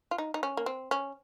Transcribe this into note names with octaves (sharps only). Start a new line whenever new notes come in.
F4
D#4
D#4
C#4
A#3
C4
C#4